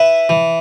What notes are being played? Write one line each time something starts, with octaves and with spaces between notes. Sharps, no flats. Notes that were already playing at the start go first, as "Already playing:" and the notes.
Already playing: E4 B4 E5
E3